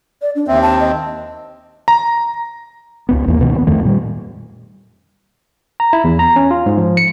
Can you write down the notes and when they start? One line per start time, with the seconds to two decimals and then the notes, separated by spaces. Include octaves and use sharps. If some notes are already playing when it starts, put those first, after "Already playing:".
0.22 D5
0.35 D4
0.48 D#2 C4 E5
0.62 A5
0.80 D#5
1.88 A#5
3.09 C#2 F#2 B3
3.26 A1 E2 A#3
3.39 C#2 B2 D#3
3.55 G2 B3
3.67 F2 D#3 A3
3.84 A#2 G3
5.80 A#5
5.93 E4
6.04 E2
6.19 A#5
6.36 C#4
6.51 F4
6.66 G#2
6.78 F3
6.97 C#7